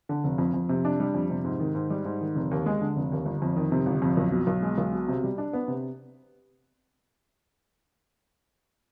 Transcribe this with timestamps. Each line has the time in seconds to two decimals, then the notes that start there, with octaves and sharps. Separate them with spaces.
0.09 D3
0.24 F1
0.38 F2
0.54 F2
0.69 C3
0.85 D4
1.00 G3
1.14 F2
1.30 C3
1.44 G#2
1.60 D#3
1.75 G#2
1.90 G3
2.05 G#2
2.21 D#3
2.35 F1
2.51 D#2
2.66 G#3
2.81 D3
2.96 F1
3.12 D#2
3.26 G1
3.42 F2
3.56 D#3
3.72 C3
3.86 G1
4.02 F2
4.17 B1
4.32 B2
4.47 B1
4.62 G#3
4.78 B1
4.93 B2
5.08 C3
5.23 G3
5.38 D4
5.53 B3
5.68 C3